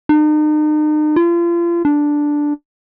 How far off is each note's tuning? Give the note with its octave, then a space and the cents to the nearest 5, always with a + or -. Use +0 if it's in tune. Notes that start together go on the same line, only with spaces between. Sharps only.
D#4 -40
F4 -35
D4 +0